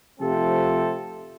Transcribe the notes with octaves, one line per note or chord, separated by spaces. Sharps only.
C3 F3 A3 C4 A4